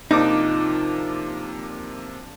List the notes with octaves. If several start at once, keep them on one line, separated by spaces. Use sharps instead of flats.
C3 F3 A#3 D4 D#4 D6